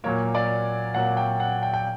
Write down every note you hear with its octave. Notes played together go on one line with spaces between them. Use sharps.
A#2 F#3 A#3 C#5
D5
A#2 F#3 A#3 F#5
G5
F#5
G5
G5